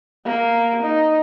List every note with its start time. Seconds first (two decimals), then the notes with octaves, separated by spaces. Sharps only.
0.25 A#3
0.82 D#4